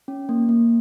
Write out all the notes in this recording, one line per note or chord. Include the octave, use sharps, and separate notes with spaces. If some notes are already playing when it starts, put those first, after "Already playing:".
C#4
A#3
A#3